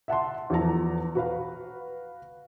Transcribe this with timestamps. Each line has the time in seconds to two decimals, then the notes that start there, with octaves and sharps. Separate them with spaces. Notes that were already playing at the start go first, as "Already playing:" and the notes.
0.08 E5 F#5 A5 C6
0.50 E2 F3 A4 A5 A#5
1.15 F#4 B4 F5